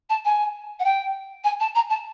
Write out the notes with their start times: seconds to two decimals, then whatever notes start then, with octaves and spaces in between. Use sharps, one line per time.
0.09 A5
0.25 G#5
0.79 F#5
0.84 G5
1.44 G#5
1.59 A5
1.74 A#5
1.89 A5